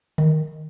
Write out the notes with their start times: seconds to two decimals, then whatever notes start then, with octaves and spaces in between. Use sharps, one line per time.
0.18 D#3